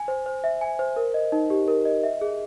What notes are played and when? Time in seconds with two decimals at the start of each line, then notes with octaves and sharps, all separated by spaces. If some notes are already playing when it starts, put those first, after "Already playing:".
Already playing: G#5
0.08 C5
0.26 C5
0.44 E5
0.61 G#5
0.79 C5
0.96 A#4
1.14 D#5
1.32 D#4
1.50 G4
1.68 A#4
1.85 D#5
2.03 E5
2.21 G#4